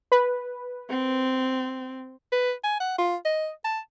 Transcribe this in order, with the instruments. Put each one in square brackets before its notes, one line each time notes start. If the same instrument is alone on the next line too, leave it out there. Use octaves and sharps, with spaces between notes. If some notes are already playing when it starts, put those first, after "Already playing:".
[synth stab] B4
[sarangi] C4
[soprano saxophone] B4
G#5
F#5
F4
D#5
A5